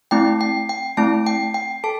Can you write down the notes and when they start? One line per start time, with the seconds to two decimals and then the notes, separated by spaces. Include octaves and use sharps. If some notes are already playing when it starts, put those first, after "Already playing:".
0.11 A3 C4 E4 G5
0.41 G5
0.69 G5
0.97 A3 C4 E4 A5
1.26 G5
1.54 G5
1.84 A4 A5